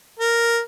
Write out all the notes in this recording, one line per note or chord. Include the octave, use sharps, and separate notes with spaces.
A#4